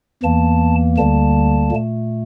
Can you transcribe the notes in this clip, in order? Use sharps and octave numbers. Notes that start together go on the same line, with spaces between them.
E2 E3 A#3 A5
D2 D3 G3 A#3 A5
A#2 A3